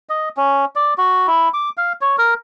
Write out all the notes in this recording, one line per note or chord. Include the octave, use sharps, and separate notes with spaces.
D#5
C#4
D5
F#4
E4
D6
F5
C#5
A#4